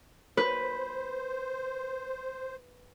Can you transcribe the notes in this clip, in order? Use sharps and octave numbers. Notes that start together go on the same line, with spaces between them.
B4 C5